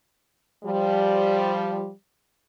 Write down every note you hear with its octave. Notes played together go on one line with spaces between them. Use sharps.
F3 G3